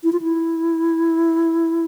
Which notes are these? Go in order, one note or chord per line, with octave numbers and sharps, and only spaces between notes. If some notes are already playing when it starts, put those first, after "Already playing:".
E4
F4
E4